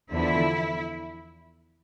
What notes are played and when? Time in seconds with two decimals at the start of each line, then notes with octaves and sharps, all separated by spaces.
0.11 E2 D3 F3 E4